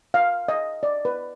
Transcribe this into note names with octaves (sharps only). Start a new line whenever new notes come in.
F5
D#5
D5
B4